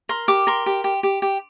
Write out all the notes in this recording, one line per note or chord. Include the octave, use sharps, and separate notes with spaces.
A#4 C6
G4 D6
A#4 C6
G4
G4
G4
G4